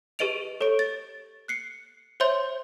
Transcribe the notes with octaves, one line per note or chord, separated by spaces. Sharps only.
G4 G#4 B4 D#5 D7 F7
A4 C#5 C#6 D7
A6
F#6 C7 C#7
C5 C#5 E5 C6 G6